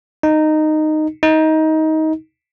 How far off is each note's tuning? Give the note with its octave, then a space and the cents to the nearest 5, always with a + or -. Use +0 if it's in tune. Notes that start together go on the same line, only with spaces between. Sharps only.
D#4 -10
D#4 +20